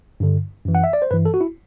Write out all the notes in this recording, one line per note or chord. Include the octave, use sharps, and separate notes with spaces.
G2 D3
F#2 E3
F#5
E5
D5
C5
G2 E3 B4
A4
F#4
E4